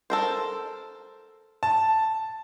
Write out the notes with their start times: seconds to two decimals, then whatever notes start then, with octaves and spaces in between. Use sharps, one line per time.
0.10 A4 A#4 C5
1.63 A5